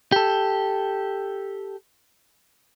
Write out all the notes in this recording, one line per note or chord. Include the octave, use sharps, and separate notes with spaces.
G4 A4